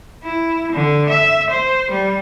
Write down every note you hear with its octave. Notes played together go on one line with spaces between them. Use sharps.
E4
D3
E5
C5
G3